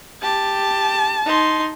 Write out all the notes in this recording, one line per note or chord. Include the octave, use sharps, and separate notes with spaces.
G4 A5
D#4 C6